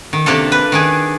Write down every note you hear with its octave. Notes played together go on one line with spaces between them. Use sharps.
D#3
C3 A#3 D4 F4 A4
B4
D#3 D4 G#4